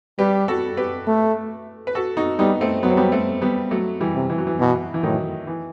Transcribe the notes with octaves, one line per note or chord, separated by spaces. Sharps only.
G3 G4 B4
F#4 A4
G4 B4
A3
B4
F#4 A4
D#4 F#4
G3 B3 D#4
A3 C4
F#3 B3
C4
G3 B3
A3 C4
G3 B3
F#3 A3
E3 G3
C3
E3
F#3
E3
B2 E3
E3
A2 D#3 F#3
E3